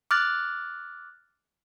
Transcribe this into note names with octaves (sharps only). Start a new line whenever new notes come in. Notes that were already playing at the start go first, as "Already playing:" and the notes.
D6 F6 F#6 A6